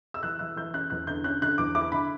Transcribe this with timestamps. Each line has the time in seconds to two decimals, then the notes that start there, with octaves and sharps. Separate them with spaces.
0.14 E6
0.23 E3 F#6
0.39 E3 F#6
0.56 E3 G6
0.74 C#4 F#6
0.90 E2 F#6
1.07 D3 G6
1.24 C#4 F#6
1.41 D3 F#6
1.58 E2 D6
1.75 E4 D6
1.92 D3 B5